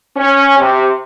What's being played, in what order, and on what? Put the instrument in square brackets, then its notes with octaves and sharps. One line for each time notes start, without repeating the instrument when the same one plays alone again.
[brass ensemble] C#4
C3